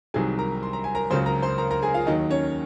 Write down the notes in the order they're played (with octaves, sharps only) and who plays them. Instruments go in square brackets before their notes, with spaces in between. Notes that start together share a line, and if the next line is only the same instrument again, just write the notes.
[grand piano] C2 C3 D#3 F#3 G#4 G#5
A#4 A#5
C6
A#5
G#5
A#4 A#5
C#2 C#3 F#3 C5 C6
A#4 A#5
C5 C6
A#4 A#5
A#4 A#5
G#4 G#5
F4 F5
D#2 D#3 F#3 D#4 D#5
C#4 C#5